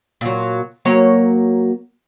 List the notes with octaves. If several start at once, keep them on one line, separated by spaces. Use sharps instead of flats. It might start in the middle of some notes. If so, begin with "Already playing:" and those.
A#2 F#3
F#3 A#3 C#5